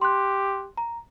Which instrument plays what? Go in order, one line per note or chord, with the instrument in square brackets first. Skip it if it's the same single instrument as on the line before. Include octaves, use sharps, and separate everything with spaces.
[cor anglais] G4 [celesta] C6 F#6
[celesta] A#5